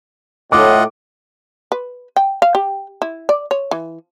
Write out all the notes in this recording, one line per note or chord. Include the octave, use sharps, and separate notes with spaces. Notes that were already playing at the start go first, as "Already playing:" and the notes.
A2 F4 D#5 F#5 D6
B4
G5
F5
G4
E4
D5
C#5
E3